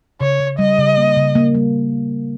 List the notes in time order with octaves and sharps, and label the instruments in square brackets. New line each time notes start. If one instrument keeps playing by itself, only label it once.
[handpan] C#3 [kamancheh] C#5
[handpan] C#3
[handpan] G3 [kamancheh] D#5
[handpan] C#3
A#3
C#3
A#3
G3